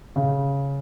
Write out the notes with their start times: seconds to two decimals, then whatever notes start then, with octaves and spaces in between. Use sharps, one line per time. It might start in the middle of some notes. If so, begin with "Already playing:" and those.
0.16 C#3